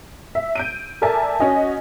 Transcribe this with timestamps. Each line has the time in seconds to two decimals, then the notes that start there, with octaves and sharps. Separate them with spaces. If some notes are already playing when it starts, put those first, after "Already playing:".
0.35 E5
0.55 G6 D7 D#7
1.02 A4 A#4 D5 E5 G#5 A5
1.40 C#4 F#4 D#5 G#5